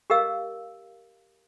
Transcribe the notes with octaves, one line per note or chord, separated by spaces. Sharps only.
G4 A#4 D#5 F5 E6